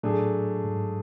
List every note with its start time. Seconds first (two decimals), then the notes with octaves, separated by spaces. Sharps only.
0.03 A2 F#3 A3 D4 G#4
0.64 G#2